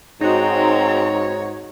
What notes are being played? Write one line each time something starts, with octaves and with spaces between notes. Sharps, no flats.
G#2 C4 D#4 F#4 C#5 A#5